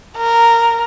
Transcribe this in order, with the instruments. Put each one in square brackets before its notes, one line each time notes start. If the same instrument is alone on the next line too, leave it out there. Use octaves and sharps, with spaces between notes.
[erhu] A#4